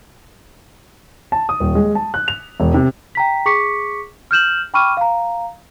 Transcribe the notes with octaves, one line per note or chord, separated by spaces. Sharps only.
A5
D#6
D#1
G#3
A5
F#6
F7
E1
C3
G5 A#5 B6
G#4 C#6 D6 B6 C#7
F6 G6 E7 F#7
G5 B5 C#6 D6 F6 D#7
F5 A#5